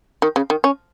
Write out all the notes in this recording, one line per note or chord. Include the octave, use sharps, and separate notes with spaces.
D#3
C#3
D#3
C#4